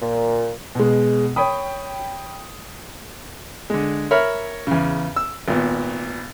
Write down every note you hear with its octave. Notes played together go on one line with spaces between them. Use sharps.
A#2
B2 G#3
C#5 G5 B5 D#6
D3 G#3
A#4 C#5 E5 B5 F6
E2 C#3
E6
G#1 A#2 B3